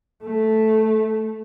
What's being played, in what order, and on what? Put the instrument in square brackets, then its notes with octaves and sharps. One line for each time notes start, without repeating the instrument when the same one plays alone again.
[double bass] A3